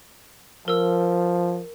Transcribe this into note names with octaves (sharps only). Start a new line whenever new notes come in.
F3 A#4 E6